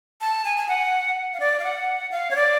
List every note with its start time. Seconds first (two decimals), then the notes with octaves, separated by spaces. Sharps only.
0.21 A5
0.45 G#5
0.58 G#5
0.68 F#5
1.33 F5
1.40 D5
1.59 F5
1.64 F#5
2.11 F5
2.31 C#5
2.36 D5